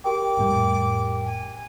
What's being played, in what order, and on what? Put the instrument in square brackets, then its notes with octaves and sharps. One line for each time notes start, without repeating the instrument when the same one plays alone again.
[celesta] G4 A#4 G5 [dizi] D6
[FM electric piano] F2 A2 G3
[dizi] G#5